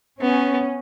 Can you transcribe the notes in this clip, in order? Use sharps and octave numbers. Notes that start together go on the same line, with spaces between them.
B3 C#4